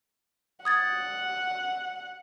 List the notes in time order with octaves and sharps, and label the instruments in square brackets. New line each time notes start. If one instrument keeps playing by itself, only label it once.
[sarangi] F#5 [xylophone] D#6 G#6 A6